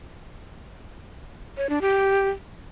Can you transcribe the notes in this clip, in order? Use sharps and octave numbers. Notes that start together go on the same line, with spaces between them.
C#5
D4
G4